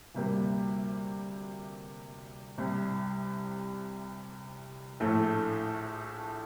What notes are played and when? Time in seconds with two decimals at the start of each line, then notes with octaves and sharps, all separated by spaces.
0.15 D2 C3 G3 A#3
2.58 C2 C3 G3
5.00 A#1 A2 A3